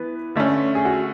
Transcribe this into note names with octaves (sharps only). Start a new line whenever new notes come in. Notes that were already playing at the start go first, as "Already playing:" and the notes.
Already playing: E3 B3 B4
D3 A3 C#4
G#4
F#4